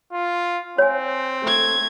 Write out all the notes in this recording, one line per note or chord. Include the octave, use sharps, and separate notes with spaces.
F4
C4 C#5 G#5
A3 G#6